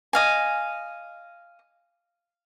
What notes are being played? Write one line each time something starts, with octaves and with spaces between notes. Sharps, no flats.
D#5 F5 G#5